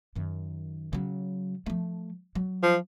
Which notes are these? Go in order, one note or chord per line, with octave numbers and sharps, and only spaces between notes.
F#2 D#3
C#3 F#3
F3 A3
F#3
F3